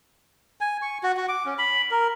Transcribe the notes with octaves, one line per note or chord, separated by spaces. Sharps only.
G#5
C#6
F#4
F#4
D6
C#4
B5
A#4